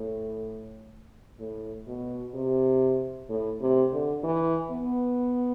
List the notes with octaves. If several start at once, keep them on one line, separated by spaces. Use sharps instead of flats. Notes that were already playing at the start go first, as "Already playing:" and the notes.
Already playing: A2
A2
B2
C3
A2
C3
D3
E3
B3